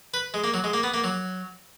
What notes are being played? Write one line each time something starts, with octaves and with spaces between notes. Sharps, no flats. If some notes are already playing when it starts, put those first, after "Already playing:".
B4
G#3
A#3
F#3
G#3
A#3
B3
A#3
F#3